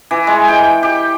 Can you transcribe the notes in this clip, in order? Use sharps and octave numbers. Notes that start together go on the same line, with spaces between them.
E3
G#3
G5
G4